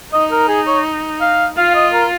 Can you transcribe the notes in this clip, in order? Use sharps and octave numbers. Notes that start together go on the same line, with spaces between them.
D#4 D#5
A#4
G#4
C#5
F5
F4 F5
D#5
A#4